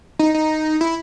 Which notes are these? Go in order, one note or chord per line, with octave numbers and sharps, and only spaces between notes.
D#4
D#4
E4